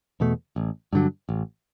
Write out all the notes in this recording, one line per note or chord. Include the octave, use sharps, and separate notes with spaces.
E2 B2 A3
A1
G2 D3 F#3
A1